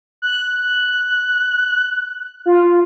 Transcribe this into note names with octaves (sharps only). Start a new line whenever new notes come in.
F#6
F4